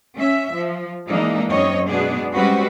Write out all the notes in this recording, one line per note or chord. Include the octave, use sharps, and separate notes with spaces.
C#4 E5
F3
E3 G#3 A#3 D4 D#4
F#2 C4 C#5 D#5
B2 G#3 B3 D4 G#4
G3 G#3 C4 C#4 F#4 B4